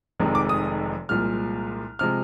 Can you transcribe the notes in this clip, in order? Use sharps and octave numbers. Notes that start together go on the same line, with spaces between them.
F1 F2 C3 D#3 G#3
D6
D#6
C2 A#2 F3 G#3 F6
C3 F3 G#3 F6